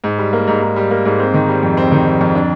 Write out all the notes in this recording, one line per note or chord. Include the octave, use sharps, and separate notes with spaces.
G#2
G3
A#3
G#2
G#2
G3
A#3
G#2
C4
D#3
G3
F2
C4
D#3
G3
F2
D4